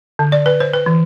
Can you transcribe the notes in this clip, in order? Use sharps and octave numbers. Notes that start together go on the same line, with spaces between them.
D3
D5
B4
C5
B4
E3